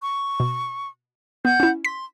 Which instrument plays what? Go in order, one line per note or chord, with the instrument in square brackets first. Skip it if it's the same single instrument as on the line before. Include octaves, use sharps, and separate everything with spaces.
[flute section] C#6
[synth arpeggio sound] B2
[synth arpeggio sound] B3 [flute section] F#5 G6
[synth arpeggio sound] C#4 E4
[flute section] C6 [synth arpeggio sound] B6